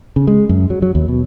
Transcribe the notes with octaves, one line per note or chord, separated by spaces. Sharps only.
C#3
G#3
F#2
F#3
F#3
D#2
B2